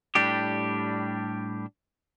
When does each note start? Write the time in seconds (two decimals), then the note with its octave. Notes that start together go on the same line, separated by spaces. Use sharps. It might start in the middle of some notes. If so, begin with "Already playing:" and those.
0.15 A2 G3 D4 G4